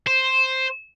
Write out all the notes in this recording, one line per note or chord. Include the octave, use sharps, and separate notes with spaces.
C5